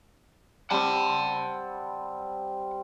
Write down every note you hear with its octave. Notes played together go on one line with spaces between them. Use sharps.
G3 C4 F#5 A5